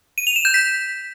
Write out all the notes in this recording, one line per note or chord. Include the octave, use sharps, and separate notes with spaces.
D#7
F7
E7
G6
B6